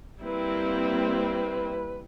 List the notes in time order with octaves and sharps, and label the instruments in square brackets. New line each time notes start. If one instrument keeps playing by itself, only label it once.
[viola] G3 E4 [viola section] A#3 C4 [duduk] B4